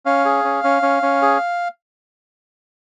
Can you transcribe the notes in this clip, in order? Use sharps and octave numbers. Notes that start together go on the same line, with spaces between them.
C#4 F5
G#4
C#4
C#4
C#4
C#4
G#4